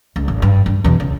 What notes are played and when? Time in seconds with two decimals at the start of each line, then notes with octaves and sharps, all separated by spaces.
0.16 C#2
0.28 G#1
0.42 G2
0.66 G2
0.84 E2 B2
1.00 C#2